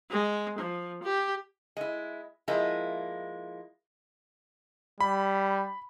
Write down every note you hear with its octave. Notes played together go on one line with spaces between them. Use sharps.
G#3
F3
G4
G#3 E4
F3 G#3 A#3 E4
G3 B5